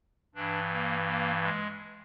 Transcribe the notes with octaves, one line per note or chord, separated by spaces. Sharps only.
G2 E3 D4
A#3
A#3
G#3